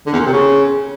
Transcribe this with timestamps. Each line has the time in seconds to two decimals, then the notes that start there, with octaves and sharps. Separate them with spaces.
0.06 D3
0.13 E2
0.19 A#2
0.26 C3
0.32 C#3